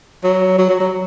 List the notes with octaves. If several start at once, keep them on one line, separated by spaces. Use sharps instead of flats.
F#3
F#3
F#3
F#3